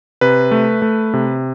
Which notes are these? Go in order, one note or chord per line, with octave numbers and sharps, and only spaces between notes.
C3 B4
A3
A3
C3